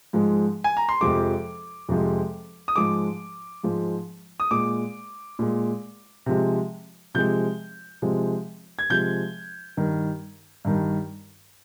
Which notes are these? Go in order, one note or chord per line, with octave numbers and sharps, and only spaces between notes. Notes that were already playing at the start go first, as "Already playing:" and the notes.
G#2 F3 G#3
G#5
A#5
C6
F2 C3 F3 G#3 D6
F2 C3 F3 G#3
D#6
G#2 F3 G#3 D6
G#2 F3 G#3
D#6
A#2 G#3 D6
A#2 G#3
C3 F3 G#3
C3 F3 G#3 G6
C3 F3 G#3
G#6
C3 F3 G#3 G6
G2 D#3 G3
G2 D#3 G3